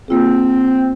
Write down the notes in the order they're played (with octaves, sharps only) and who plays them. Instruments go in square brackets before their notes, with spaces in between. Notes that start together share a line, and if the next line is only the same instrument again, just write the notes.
[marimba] A#3 F4 G#4 [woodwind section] C4